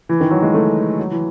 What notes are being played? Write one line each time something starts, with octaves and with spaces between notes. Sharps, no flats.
E3
D#3
F#3
G#3
A3
F#3
E3